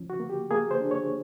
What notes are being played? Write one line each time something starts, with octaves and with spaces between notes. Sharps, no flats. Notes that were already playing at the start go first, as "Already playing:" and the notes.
Already playing: F3 C#4
F#4
A#3
G4
A#3 G#4
C5
D4
C#5